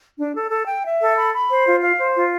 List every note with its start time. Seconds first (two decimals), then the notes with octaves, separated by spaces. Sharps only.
0.17 D4
0.34 A4
0.50 A4
0.67 G5
0.83 E5
1.00 A4
1.16 B5
1.33 B5
1.49 C5
1.66 F4
1.81 F5
1.99 C5
2.15 F4